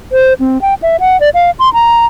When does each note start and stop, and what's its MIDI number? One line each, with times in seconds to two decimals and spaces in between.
0.12 0.33 72
0.40 0.61 60
0.62 0.74 79
0.82 0.97 76
1.00 1.19 78
1.20 1.29 74
1.34 1.51 77
1.59 1.72 84
1.73 2.05 82